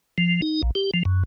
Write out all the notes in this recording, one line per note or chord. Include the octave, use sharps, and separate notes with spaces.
F3
D#4
A#1
G4
F3
F#2